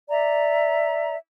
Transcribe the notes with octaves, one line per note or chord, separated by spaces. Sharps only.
D5 E5 A#5